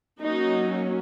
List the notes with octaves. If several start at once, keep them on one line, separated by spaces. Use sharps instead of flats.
F#3 A#3 C#4 D#4 F#4